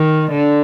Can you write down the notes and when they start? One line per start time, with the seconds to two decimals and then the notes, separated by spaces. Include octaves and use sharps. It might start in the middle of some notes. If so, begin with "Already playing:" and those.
Already playing: D#3
0.31 D3